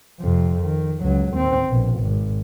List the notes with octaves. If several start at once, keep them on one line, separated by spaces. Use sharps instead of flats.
F2 C3
D#3
C#2 F#3
D#2 C4
A#1 B2
G#1